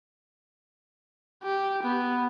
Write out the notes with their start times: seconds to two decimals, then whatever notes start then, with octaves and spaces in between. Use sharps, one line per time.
1.43 G4
1.83 B3